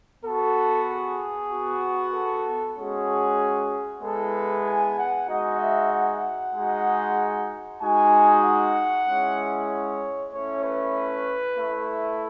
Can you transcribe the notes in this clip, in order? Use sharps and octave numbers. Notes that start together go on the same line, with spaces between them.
B3 F#4 A4
G#4
B3 F#4
A4
G#3 C#4 F#4 G#4
G#3 B3 E4 A4
G#5
F#5
G#3 D#4 F#4 D#5
E5
F#5
G#3 D#4 F#4
G#3 D#4 F#4 G#5
F#5
G#3 C#4 E4
C#5
A3 C#4 E4 C#5
B4
A3 E4